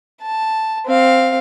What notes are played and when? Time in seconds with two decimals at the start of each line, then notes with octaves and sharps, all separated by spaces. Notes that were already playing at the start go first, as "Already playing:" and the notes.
0.22 A5
0.86 C4 F5